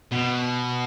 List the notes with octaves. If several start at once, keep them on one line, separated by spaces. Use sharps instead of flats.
B2